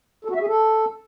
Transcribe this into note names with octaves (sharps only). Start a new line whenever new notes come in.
A4
F#4
E5
G#4
A4